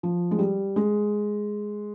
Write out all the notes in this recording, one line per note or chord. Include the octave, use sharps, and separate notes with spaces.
F3
G#3
G3
G#3